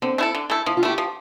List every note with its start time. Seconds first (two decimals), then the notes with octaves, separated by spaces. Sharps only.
0.02 D3 C4
0.18 A3 E4 A4
0.35 D3
0.50 A3 E4 A4
0.66 F3 E4
0.77 F4
0.83 A3 E4 G4
0.98 F3